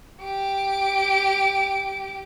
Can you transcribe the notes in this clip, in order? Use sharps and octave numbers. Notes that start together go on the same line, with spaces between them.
G4 D7